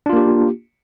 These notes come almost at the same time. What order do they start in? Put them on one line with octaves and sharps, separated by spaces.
D4 F4 A#3 G4